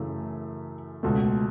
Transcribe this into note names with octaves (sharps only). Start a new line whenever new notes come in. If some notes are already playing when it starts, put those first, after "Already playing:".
Already playing: F#2 C#3 E3 A3
C#2 B2 A3